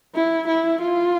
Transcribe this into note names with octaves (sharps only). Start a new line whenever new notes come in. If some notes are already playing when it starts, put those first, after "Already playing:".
E4
E4
F4